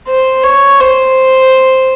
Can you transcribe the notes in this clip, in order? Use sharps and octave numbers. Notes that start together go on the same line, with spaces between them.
C5
C#5
C5